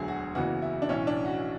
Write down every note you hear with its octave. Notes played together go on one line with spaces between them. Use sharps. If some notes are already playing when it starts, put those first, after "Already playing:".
Already playing: E1 D2 D3 F#3 G#4
F#4
F#1 E2 C#3 E3 F#4
E4
D4
B1 A2 E3 C#4
D4
F#4